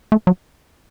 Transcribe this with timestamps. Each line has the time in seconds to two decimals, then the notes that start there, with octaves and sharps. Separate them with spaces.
0.12 A3
0.27 F#3